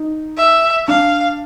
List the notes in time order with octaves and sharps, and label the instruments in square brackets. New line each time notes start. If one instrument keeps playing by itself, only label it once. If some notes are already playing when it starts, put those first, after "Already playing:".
Already playing: [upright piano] D#4
[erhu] E5
[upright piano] D4 [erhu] F5